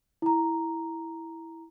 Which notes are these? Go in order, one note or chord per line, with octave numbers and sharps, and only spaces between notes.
E4 A#5